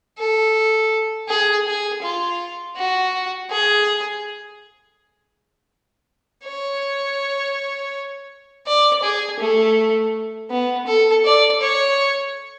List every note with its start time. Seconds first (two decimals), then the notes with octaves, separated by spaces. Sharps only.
0.18 A4
1.29 G#4
1.66 G#4
2.03 F4
2.77 F#4
3.51 G#4
6.45 C#5
8.67 D5
9.03 G#4
9.40 A3
10.51 B3
10.87 A4
11.25 D5
11.62 C#5